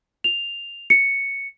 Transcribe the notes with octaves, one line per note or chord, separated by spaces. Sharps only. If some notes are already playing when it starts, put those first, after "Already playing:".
F7
C#7